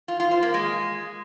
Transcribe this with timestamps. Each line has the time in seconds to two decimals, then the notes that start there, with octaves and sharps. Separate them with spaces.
0.08 F4
0.20 F4
0.31 C5
0.42 A#3
0.54 G#3